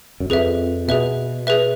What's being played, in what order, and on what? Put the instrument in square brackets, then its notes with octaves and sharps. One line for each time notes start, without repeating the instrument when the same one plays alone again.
[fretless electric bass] F#2
[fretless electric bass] F2 [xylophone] G#4 B4 E5
[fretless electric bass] B2 [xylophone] G#4 B4 E5
[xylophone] G#4 B4 E5